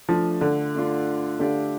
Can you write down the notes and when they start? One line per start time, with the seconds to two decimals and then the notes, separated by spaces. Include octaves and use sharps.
0.09 F3 A3 D4 F4
0.41 D3
0.74 A3 D4 F4
1.39 D3 A3 D4 G4 D5 F5